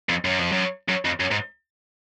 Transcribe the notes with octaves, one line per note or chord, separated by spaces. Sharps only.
F2
F#2
F2
F#2
F#2
F2
F#2
G#2